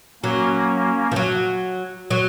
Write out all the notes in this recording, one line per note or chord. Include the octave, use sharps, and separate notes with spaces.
F#3 A#3 C#4
F3
F#3
F#3